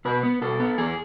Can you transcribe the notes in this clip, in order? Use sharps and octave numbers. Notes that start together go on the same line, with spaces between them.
B2 B4
B3
B2 A4
B3
E2 G#4